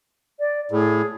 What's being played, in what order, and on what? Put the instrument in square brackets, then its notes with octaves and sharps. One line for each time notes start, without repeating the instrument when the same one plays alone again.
[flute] D5
[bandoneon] A2 [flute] G#4